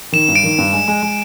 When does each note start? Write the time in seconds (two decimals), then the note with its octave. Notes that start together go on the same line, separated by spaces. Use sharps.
0.12 D#3 E7
0.29 G2
0.35 D7
0.44 D#3
0.59 G2
0.72 G#3
0.88 G#3
1.03 G#3